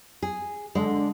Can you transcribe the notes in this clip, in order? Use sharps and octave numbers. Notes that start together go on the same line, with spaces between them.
G#4
D3 G#3